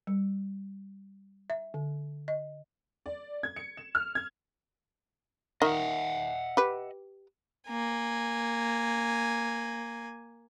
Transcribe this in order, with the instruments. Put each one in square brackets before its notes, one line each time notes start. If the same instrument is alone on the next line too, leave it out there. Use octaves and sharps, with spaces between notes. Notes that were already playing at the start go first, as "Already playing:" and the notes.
[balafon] G3
E5
D3
D#5
[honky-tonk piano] D5
G#6
C#7
E7
F6
G#6
[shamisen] D#3 [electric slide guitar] D#5 E5 F#5
[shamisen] G4 B4
[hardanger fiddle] A#3 G#5